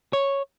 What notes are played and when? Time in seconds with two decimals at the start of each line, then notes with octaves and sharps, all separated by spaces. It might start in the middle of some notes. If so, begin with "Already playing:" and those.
0.13 C#5